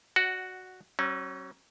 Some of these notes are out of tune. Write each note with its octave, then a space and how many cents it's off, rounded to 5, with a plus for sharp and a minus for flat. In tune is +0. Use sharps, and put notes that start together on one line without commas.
F#4 +0 D5 +20 F#5 +15
F#3 +30 C#4 -35